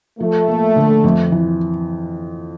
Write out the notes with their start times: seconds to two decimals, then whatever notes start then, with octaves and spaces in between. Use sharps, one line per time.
0.20 F3 A3
0.48 A#3
0.76 D3
1.04 F2
1.32 E3